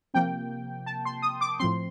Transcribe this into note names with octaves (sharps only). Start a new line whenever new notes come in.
C3 F3 A#3 G5
A5
C6
D#6
D6
A2 F3 C4 C6